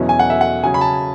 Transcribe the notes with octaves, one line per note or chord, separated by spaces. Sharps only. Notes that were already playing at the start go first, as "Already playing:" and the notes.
Already playing: E2 B2 F#3 C#4 E4 E5
G#5
F#5
E5
F#5
C#3 F#3 C#4 G#5
B5
A5